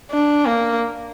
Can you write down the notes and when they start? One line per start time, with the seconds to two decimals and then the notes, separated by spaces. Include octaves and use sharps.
0.11 D4
0.45 A#3